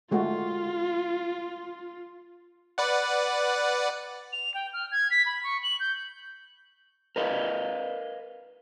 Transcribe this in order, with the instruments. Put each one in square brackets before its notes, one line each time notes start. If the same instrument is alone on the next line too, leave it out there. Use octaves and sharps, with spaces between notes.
[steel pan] G#3 A3 F#4 [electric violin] F4
[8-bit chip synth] B4 D5 F#5
[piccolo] F7
G5
F6
G#6
B6
B5
C#6
F#7
G6
[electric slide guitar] A#4 B4 D#5 F5